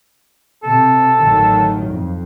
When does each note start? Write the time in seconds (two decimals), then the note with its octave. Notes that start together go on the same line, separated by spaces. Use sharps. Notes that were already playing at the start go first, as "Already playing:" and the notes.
0.63 C3 A4
1.22 A1 D#3 F#3
1.89 F2